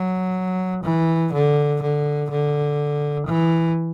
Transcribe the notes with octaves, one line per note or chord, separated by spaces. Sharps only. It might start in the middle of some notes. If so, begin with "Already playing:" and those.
Already playing: F#3
E3
D3
D3
D3
E3